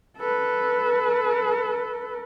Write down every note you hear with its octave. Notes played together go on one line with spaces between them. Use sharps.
A4 B4